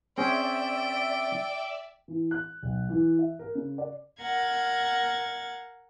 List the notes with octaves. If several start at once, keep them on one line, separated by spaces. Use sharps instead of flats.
C4 C#4 G#4 D5 E5 G5
E3
F#6
B1
E3
E5
A#4
C#3
D5
A#4 F5 F#5 G#6 A6